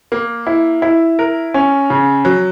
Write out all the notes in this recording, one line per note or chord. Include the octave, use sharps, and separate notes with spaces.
A#3
E4
E4
A#4
C#4
C#3
F#3